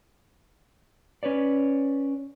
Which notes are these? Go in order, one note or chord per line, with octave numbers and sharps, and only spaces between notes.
C#4 B4 C#5 D5